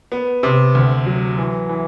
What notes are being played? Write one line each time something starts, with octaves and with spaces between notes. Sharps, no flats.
B3
C3
D2
F#3
E3
E3